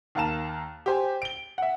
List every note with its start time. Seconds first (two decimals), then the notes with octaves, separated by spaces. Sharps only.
0.15 D#2 A#3 F5 A5 A#5 E7
0.86 G4 C5 G#5
1.22 D7 G7
1.58 E5 F#5